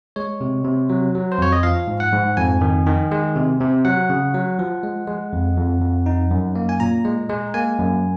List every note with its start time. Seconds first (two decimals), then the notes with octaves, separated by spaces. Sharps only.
0.16 G#3 C#5
0.41 C3
0.65 C3
0.89 F#3
1.15 F#3
1.32 C5
1.38 F2 C#5
1.52 D#5
1.63 F3 F5
1.88 G#2
2.00 F#5
2.13 G#2
2.37 F2 G#5
2.61 D#3
2.86 D#3
3.11 G#3
3.36 C3
3.60 C3
3.85 F#3 F#5
4.10 C#3
4.34 F#3
4.59 F3
4.83 G#3
5.07 G#3
5.33 F2
5.57 F2
5.81 F2
6.06 D#4
6.31 F#2
6.55 A#3
6.69 G#5
6.80 A#2 A#5
7.05 G#3
7.29 G#3
7.54 A#3 G#5
7.79 F#2